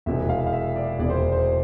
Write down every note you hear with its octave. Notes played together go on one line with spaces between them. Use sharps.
E1 E2 C3 E3 E5
F5
F5
E5
D5
E1 E2 C3 E3 D5
C5
C5